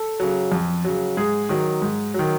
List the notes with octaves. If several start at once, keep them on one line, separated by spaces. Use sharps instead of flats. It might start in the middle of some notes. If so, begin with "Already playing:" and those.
Already playing: A4
C#3 F#3
F2
C#3 F#3
G#2 G#4
D#3 F#3
G#2
D#3 F#3